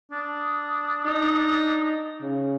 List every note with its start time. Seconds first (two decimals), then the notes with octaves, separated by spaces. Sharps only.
0.12 D4 D#6
1.05 D#4
2.21 C#3